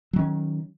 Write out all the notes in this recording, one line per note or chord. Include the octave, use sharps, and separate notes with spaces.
D#3 F#3 C#4